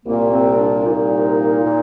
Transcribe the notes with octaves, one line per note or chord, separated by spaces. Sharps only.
C2 A#2 A#3
C4
D4
C2 A#2 D#4
A#2